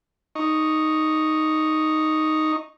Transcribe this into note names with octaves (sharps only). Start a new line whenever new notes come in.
D#4 C#6